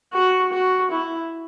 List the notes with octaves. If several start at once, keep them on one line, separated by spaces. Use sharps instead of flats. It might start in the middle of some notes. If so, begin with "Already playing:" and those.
F#4
F#4
E4